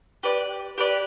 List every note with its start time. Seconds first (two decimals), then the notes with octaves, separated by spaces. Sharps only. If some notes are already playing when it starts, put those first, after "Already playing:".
0.23 G4 B4 D5
0.78 G4 B4 D5